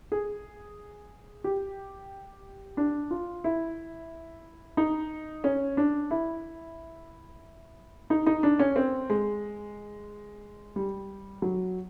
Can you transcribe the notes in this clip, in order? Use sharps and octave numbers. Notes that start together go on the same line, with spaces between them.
G#4
G4
D4
F4
E4
D#4
C#4
D4
E4
D#4
D#4
D4
C#4
C4
G#3
G3
F#3